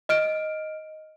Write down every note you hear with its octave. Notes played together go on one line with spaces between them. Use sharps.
D#5 F6 D7